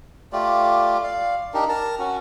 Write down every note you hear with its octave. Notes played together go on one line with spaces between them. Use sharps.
A3 F4 G4 D5
D5 F5
D4 D#4 G4 A#4
A#4 A5 A#5
C#4 F#4